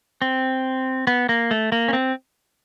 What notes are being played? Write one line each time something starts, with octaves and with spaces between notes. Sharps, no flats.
C4
B3
A#3
A3
A#3
C#4
C4